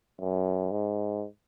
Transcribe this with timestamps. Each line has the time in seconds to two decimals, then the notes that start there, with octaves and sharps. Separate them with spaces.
0.21 F#2
0.71 G#2